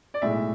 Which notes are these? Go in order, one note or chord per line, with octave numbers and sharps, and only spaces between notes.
D5
B1 A2 G#3 E5